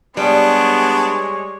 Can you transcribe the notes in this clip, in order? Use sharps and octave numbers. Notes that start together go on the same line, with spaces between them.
G3 G#3 B3 D4 C#5